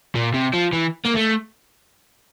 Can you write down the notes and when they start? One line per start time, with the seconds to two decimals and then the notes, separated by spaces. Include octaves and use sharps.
0.15 A#2
0.34 C3
0.53 F3
0.73 E3
1.06 A#3
1.16 A3